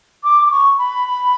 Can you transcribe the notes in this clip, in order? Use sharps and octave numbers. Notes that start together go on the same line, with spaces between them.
D6
D6
C#6
B5